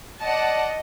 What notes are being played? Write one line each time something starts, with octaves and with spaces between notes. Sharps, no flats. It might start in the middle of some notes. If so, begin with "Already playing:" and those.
D5 D#5 F#5 A5